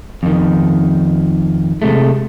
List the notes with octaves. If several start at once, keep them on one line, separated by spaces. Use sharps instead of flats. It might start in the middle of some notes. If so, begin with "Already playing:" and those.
F2 D#3
C3 G#3 A3